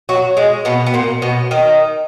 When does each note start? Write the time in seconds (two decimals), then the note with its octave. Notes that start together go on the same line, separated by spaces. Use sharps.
0.09 F#3 F#4
0.37 G#3 G#4
0.65 B2 B3
0.86 B3
0.94 A#2 A#3
1.22 B2 B3
1.51 D#3 D#4